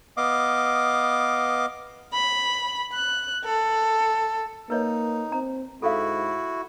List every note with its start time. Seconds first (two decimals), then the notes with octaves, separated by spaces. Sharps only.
0.17 B3 D#5 F5 D6
2.13 B5
2.92 F#6
3.45 A4
4.70 A#3 D#4 B4 C#5 D#5
5.32 C4 A#5
5.82 G#2 E4 F#4 A4 F5